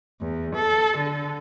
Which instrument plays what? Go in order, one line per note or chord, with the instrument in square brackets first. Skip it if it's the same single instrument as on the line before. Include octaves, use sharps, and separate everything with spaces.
[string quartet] E2
A4
D3